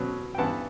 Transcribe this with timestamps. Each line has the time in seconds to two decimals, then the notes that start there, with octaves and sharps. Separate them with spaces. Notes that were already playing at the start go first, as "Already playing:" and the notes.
Already playing: B2 F#3 B3
0.35 G5
0.38 G2 E3 B3 F#5 A5